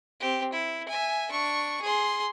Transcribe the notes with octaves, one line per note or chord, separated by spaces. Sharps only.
C4 G4
E4
E5 G#5
D4 C#6
G#4 C6